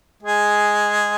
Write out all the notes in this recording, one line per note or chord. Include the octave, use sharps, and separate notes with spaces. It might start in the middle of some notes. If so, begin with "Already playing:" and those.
G#3 G#4